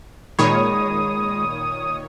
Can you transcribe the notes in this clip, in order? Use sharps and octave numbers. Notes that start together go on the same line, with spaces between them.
A#2 D#3 G#3 C#5 B5 D#6